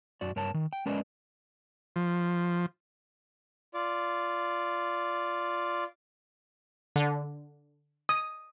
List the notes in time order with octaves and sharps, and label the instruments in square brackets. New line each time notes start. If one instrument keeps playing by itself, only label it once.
[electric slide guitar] F#2 F#4 D5
G2 A#4 C#5 A5
D#3
G5
G#3 C#4 A#4 B4 D5 D#5
[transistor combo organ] F3
[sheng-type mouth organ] F4 D5
[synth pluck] D3
[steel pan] D#6